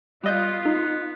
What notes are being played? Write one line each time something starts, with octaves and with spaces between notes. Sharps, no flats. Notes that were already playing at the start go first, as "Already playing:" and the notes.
G3 B3 F4 D#5 G6
D#4